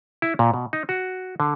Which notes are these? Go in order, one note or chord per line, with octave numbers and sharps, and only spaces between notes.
E4
A#2
B2
D#4
F#4
D3